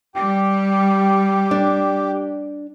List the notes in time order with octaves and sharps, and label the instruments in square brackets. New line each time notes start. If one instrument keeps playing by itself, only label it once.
[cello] G3 [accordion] G4
[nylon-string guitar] D4